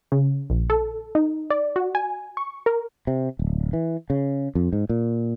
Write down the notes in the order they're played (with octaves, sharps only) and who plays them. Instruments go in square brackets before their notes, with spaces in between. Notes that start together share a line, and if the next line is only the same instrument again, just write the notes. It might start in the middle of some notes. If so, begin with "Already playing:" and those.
[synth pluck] C#3
A#1
A4
D#4
D5
F#4
G#5
C#6
A#4
[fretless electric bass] C3
D1
E3
C#3
F2
G#2
A#2